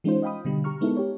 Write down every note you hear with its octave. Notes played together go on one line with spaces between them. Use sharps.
E3 G#3 C#4 D#4 F4 C5
D#5 F5 G5 B5 D#6
B2 D3 G3
G4 A#5 C#6 F6
G#3 B3 D#4 E4 A4 A#4
G4 C#5